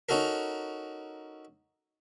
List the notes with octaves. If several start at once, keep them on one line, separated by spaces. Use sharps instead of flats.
C#4 D#4 F#4 A4 A#4